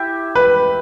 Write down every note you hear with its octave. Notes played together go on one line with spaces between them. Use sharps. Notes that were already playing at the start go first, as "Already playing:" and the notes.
Already playing: E4 G4 E5
B4